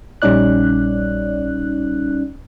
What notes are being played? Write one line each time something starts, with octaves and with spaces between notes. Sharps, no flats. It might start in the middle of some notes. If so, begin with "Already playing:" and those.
A#1 G3 C#4 D#4 D5 F#6